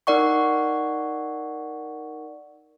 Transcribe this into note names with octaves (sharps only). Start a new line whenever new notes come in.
D#4 A#4 D5 F#5 C#6